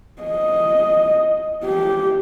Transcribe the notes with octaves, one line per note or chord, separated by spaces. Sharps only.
D#5
G4